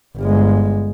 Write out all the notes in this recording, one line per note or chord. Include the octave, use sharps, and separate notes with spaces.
G1 G#3